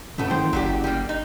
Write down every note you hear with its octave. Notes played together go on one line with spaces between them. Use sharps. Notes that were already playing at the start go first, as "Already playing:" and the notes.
G2 C#3 A3 B3 A4
F#1 D#3 C5 G5
G1 F#3 G3 G4
G3 A#3
D#4